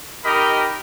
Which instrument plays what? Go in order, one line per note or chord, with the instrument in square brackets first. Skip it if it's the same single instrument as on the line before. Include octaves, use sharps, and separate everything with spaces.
[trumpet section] D#4 G4 A#4 D#5 B5